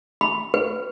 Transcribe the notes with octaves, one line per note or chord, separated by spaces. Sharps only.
B5
B4